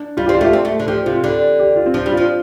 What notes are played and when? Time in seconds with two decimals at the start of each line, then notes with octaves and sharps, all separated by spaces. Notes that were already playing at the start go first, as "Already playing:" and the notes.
Already playing: D4
0.17 G3 F4
0.26 G4
0.29 C4
0.35 F4
0.41 A3
0.44 G4
0.53 C4 A4
0.65 A3
0.80 D3
0.88 F3 G4
1.06 C3 F4
1.24 D3 G4
1.60 G4
1.76 F4
1.86 C4
1.94 F3 D4
2.06 G3
2.12 F4
2.17 F3